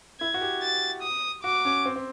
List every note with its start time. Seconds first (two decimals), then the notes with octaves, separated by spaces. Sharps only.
0.20 E4 G#6
0.34 F#4
0.41 G4
0.62 A6
1.03 D#6
1.43 F#4 D6
1.65 C#4
1.86 C4
1.96 C4